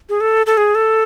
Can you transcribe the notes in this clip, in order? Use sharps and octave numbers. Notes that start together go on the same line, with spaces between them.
G#4
A4
A4
G#4
A4